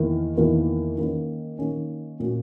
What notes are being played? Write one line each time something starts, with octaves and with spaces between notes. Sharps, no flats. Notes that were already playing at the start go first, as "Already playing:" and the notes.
Already playing: E2 D#3 A#3 E4 A#4
E2 D#3 A#3 E4 A#4
D#3 A#3 C#4
D#3 A#3 C#4
A#2 A#3 C#4 F#4